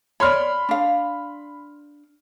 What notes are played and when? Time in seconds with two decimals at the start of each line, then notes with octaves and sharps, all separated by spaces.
0.20 C#5 D5 B5 C6 F6
0.69 D4 F5